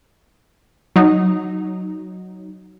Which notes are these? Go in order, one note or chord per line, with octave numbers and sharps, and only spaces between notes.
F#3 D#4